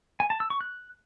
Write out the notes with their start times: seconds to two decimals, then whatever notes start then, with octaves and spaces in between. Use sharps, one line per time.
0.20 G#5
0.30 A5
0.40 E6
0.50 C#6
0.61 F#6